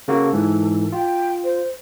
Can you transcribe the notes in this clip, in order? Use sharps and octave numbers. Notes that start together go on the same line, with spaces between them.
C#3 A#3 F#4 A4
G#2 E3
F4 G5
C5